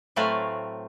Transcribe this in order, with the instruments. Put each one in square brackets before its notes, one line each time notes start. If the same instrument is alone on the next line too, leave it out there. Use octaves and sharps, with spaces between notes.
[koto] A2 F#3 A3 C4 B4 F5